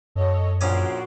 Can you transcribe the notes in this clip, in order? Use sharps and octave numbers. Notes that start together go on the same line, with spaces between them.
F#2 A4 C#5 D#5
A#1 C#4 F#4 D5 G#5 C6